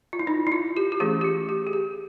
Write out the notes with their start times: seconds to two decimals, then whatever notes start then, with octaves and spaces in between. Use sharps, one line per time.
0.13 F4
0.19 E4
0.27 D#4
0.47 E4
0.52 F4
0.77 G4
0.92 G4
1.00 E3 A3 C#4 G#4
1.21 G4
1.24 F#4
1.49 G4
1.67 G#4
1.73 G4